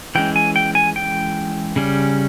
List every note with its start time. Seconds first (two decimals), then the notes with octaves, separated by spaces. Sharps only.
0.15 E3 G#3 C#4 G5
0.36 G#5
0.56 G5
0.75 G#5
0.96 G5
1.76 C#3 G3 C#4